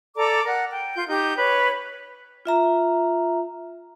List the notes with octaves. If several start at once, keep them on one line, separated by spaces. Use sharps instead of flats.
A4 D5 A#5 D6
A#4 F#5
G5
F4 G6
D#4 G4 G6
B4 C#5
F4 E5 A#5